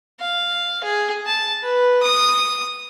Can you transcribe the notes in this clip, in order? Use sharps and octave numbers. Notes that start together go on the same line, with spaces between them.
F5
G#4
A5
B4
D#6